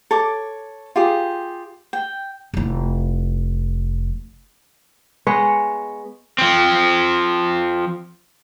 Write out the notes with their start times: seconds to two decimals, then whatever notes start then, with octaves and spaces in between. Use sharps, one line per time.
0.11 A4 C#5 D6
0.96 F4 G4 G#4
1.93 G5
2.54 F1 E4
5.27 G#3 B3 C#5 F#5
6.38 F3 C4